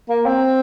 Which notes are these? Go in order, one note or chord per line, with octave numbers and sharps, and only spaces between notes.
A#3
C4